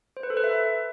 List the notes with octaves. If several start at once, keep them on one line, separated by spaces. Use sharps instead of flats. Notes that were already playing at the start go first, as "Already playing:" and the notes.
C5
B4
A4
B4
E5